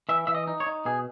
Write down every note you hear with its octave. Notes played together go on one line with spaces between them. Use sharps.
E3 E5
E3 E5
D#5
D#4
C#5
D#4
B2 G#4